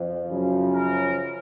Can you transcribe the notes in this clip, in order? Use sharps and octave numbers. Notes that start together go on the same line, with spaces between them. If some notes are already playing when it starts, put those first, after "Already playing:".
Already playing: F2
F#2 C#3 F3
A#4